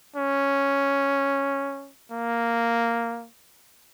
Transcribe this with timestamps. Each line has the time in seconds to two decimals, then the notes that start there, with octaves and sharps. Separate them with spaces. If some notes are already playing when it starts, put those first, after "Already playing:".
0.16 C#4
2.11 A#3